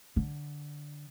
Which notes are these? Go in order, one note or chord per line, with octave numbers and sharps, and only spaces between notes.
D3